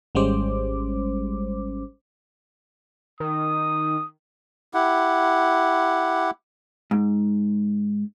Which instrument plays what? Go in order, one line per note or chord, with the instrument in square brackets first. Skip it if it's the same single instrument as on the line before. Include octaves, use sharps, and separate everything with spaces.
[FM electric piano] G#1 G3 G#3 C#4 C5 D6
[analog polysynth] D#3 [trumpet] D#6
[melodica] E4 G4 F#5
[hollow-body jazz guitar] G#2